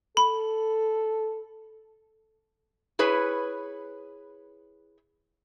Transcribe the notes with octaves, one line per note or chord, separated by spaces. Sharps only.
A4 B5
E4 G#4 B4 C#5